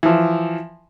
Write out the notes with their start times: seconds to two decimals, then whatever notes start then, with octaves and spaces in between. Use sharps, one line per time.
0.03 E3 F3